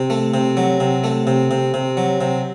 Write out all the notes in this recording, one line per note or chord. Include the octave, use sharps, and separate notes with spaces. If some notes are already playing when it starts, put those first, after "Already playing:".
Already playing: C3
A3
C3
F#3
C3
A3
C3
C3
C3
F#3
C3